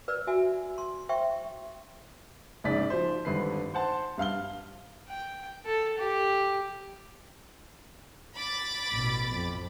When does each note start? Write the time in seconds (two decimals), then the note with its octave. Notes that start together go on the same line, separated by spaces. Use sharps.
0.08 B4 D5 E6
0.27 F#4 E5 G#5
0.78 C6
1.09 C5 E5 G5 C6 C#6
2.64 A#1 G#2 C#3 D5 B6
2.90 F3 C5
3.25 G#1 G2 D3 B4 C7
3.74 C5 F#5 A5 C6
4.18 G2 F5 F6 G7
5.09 G5
5.66 A4
5.98 G4
8.36 B5 D6 A6
8.92 A1 B2
9.34 F2